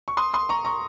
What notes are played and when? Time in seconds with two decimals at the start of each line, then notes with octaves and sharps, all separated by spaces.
0.08 C#6
0.17 C6 D#6
0.34 C6 D#6
0.49 A#5 C#6
0.65 A#5 C#6